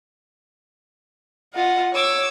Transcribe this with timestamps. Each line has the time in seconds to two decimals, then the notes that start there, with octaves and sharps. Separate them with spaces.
1.54 F4 D#5 F#5
1.95 C#5 D6 E6